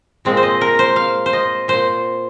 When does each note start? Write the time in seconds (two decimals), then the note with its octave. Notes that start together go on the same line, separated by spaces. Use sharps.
0.25 A#2 G#3 C4
0.37 C5
0.43 D#5
0.61 A#4
0.79 C5
0.96 F5
1.26 C5
1.33 D#5
1.68 A#2 C5